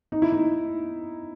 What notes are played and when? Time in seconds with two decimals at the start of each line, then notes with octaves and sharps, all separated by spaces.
0.12 D#4
0.22 E4
0.33 D#4